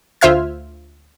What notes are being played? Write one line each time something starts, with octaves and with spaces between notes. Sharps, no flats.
D2 F4 C5 E5 F6 G#6